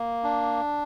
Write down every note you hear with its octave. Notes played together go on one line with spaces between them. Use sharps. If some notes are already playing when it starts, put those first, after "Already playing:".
Already playing: A#3
D4